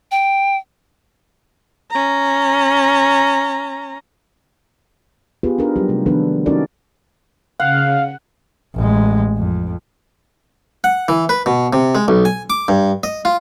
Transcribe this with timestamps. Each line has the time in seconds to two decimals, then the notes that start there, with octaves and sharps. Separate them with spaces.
0.11 G5
1.91 C#4 A#5
5.43 B3 F4 G4 G#4 B4
5.58 D4 D#4 A#4 B4
5.76 F#3 G3 G4
5.89 C3 A3
6.06 D#3 F3 B3 D4 A4 B4
6.46 C#4 D#4 F#4 A4 A#4 D5
7.60 C#3 F5 F#5
8.75 A1 G#3
9.38 F2
10.84 F#5
11.08 E3
11.29 B4
11.46 B2
11.73 C3
11.95 G#3
12.08 B1
12.25 G#5
12.50 D6
12.68 G2
13.03 D#5
13.25 F4